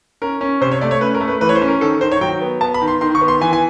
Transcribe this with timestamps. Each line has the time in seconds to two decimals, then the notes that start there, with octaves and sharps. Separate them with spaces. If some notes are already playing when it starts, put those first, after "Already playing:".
0.22 C#4 A#4
0.41 C#4
0.61 C3 C5
0.72 C#5
0.81 A3 D5
0.91 C#5
1.01 C#4 B4
1.14 A#4
1.21 A3
1.28 B4
1.41 E3 B4
1.49 C#5
1.55 C5
1.61 C#4
1.68 A#4
1.81 D#3 A4
2.01 D#3 C5
2.12 C#5
2.21 F#3 G5
2.41 B3
2.61 B3 A5
2.74 B5
2.82 D#3
2.88 C6
3.01 D#3 C6
3.15 C#6
3.21 B3
3.28 C6
3.41 E3 G#5
3.53 G#5